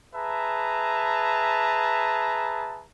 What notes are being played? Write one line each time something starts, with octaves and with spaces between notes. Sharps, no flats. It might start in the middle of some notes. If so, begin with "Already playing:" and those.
G#4 B4 E5 A5 A#5